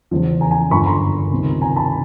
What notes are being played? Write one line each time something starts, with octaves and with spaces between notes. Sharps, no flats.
E2 C#3 F3
G#5 A#5
G#5 A#5
G1 F#2 D3 F3 B5 C#6
A#5 C6
C#2 C3 D#3
G#5 A#5
A5 B5